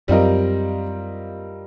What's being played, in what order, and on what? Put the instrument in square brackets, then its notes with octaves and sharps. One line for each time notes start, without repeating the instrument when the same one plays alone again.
[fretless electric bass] F#2 [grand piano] G3 C4 F4 A#4 D#5